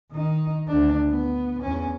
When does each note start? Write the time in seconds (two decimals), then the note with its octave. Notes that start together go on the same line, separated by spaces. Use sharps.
0.11 D#3 D#4
0.68 D2 D4
1.09 B3
1.63 E2 C#4